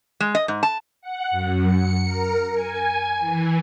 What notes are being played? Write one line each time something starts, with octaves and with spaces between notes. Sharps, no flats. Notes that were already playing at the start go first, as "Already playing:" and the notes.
G#3
D#5
G#2
A5
F#5
F#2
C#7
A#4
G#5
E3